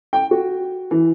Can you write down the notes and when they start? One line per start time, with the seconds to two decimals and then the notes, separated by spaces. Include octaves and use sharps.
0.13 G5
0.31 F#4
0.91 E3